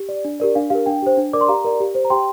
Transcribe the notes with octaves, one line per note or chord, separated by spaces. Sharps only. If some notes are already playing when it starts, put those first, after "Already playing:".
Already playing: G4
D5
D4
G4 A#4 D5
D4 F5
G4 A#4 F5
D4 G5
G4 C5
D4
A#4 D5 D6
C6
G4 F5 A#5
A#4 D5
G4
C5
A#5
G4 G5 C6